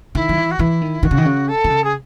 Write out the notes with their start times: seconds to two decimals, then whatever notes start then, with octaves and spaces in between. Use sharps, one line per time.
0.14 D#3 E4
0.29 F#3
0.36 E3
0.51 F#4
0.59 E3 E4
0.81 D#3
1.03 D#3 F#4
1.11 C#3
1.18 D#3
1.25 C#3
1.48 A4
1.64 D#3
1.70 C#3
1.83 G#4